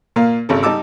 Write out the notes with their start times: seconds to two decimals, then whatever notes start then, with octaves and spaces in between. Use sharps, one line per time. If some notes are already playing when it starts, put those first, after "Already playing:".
0.16 A#2 A#3 F5
0.49 G#1 C#3 A4
0.63 G3 D#4 A5 D6 E6